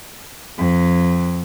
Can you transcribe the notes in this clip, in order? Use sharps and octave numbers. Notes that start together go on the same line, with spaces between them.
F2